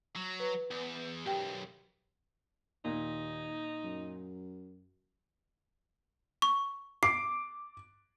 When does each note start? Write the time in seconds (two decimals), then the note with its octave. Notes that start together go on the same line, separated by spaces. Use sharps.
0.16 F#3
0.40 B4
0.71 E2
1.26 B1 F#2 G4 G5
2.85 D#2 A#2 D#4
3.84 F#2
6.42 C#6
7.03 D6 C7 D7